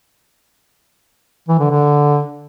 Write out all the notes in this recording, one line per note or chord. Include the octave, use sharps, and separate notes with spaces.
E3
D3
D3